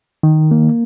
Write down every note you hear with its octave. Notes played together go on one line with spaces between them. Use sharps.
D#3
A#3